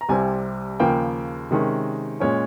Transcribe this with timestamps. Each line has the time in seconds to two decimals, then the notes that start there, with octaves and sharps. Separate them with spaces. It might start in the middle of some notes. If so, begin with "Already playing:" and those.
0.01 A#5
0.09 C2 C3 G3 C4 G#5
0.79 D#2 C#3 F3 A#3 G5
1.51 C3 D#3 G#3 C#4
2.20 A#2 G#3 C#4 C#5